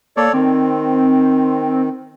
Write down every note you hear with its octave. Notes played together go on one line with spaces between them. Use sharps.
A#3 A4 C#5 D5
D#3 C4